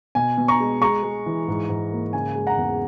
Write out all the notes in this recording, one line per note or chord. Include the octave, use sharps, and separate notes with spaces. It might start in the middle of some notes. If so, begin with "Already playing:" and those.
B2 G#5
B2
A#5 C#6
G#3
G#3 A#5 C#6
G#3
E3
G#2
G#2
A#3
C#3 G#5
G#3
F#5 A#5
E2